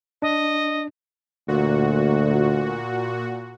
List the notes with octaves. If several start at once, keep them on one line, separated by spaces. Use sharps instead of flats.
D4 D#5
D2 A#2 F#4